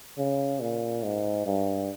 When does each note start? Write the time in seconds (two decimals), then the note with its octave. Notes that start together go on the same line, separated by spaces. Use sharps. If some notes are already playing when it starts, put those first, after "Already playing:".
0.18 C#3
0.61 A#2
1.03 G#2
1.46 G2